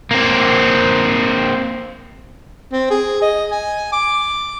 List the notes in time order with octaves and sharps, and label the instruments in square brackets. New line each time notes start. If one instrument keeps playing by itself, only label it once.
[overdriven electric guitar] A#3 C4
[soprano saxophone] C4
G#4
D#5
G#5
D6